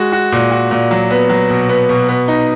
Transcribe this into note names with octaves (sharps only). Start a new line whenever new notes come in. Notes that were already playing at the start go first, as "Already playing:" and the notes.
Already playing: G#3 F#4
F#4
A#2
F#4
A#2
F#3
B3
F#3
B2
B3
B2
B3
D#4